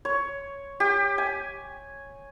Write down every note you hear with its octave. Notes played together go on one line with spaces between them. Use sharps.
C#5
G4
G#5